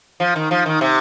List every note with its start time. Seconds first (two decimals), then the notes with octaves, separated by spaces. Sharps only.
0.20 F3
0.36 D#3
0.51 F3
0.66 D#3
0.81 C3